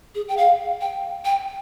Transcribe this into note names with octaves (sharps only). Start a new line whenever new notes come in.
G#4
G5
F5
G5
G5